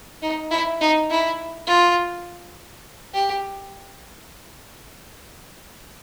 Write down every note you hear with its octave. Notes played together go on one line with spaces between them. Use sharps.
D#4
E4
D#4
E4
F4
G4